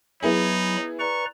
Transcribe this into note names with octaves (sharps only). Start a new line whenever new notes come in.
F#3 B3 D#4 E4 G#4 B5
B4 D5 A#5 C#6